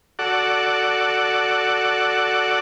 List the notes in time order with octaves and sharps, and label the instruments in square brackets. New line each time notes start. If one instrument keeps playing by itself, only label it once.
[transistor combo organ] F#4 A4 D5 F#5